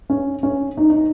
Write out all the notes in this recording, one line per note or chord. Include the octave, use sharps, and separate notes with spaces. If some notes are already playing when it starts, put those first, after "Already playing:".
C#4
C#4
D#4
D#4